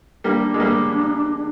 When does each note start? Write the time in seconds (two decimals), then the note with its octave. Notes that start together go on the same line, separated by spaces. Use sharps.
0.24 G3 A#3 D4 D#4
0.54 G#3
0.60 G3 A#3